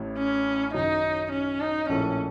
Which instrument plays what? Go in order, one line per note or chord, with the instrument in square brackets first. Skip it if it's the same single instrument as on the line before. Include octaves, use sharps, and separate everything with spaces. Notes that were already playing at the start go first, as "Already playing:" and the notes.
Already playing: [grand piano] A1 A2
[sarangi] C#4
[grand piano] F#2 D#3 F#3 [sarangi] D#4
[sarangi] C#4
D#4
[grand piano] A#1 A2 A3 [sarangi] C#4